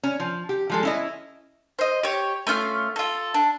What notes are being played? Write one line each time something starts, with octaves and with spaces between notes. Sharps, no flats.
C#4
F3
G4
F3 G#3 A4
C#4 E4 D#5
C5 D#5
G4 C#5
A3 C#4 F4 F5
F4 A4
D4